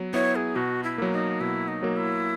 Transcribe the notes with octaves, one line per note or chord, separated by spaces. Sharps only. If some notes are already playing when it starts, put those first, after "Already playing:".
Already playing: F#3 B3
B3 E4 C#5
G#4
B2 F#4
E4
F#3 A#3
D#4
B2 E4
D#4
F#3 A#3
E4